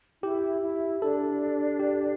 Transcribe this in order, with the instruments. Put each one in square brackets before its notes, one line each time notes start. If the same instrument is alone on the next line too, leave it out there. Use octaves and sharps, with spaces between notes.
[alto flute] E4 [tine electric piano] G4
[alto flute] E4
[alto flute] D4 [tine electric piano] A4
[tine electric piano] G4